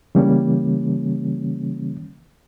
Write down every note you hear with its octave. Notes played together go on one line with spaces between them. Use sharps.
C#3 E3 G3 A#3 C#4